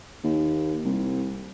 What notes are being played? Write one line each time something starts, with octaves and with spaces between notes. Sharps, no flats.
D#2
C2